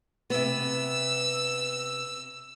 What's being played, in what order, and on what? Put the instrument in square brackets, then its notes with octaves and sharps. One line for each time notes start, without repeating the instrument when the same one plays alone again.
[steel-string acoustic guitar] C3 B3 [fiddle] E6